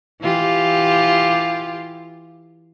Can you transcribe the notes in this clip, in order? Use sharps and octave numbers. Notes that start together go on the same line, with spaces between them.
E3 F4 G4